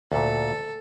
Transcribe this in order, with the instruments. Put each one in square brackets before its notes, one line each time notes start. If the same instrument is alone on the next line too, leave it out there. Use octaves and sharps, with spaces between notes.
[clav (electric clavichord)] D2 A#2 [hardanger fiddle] A4